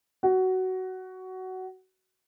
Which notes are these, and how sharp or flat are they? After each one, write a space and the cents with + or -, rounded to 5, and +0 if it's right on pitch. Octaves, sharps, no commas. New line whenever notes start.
F#4 +15